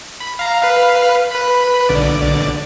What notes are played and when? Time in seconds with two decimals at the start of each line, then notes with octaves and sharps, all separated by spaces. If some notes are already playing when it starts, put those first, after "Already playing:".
0.20 B5
0.39 F5 A#5
0.63 B4 F5
1.31 B4 B5
1.89 B1 D3 D5